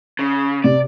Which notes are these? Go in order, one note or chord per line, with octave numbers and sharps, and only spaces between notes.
C#3
C3 D5